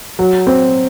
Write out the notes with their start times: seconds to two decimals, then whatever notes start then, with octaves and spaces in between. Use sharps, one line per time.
0.19 F#3
0.47 C4